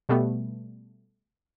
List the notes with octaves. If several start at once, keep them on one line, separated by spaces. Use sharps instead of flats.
B2 G3 A3 B3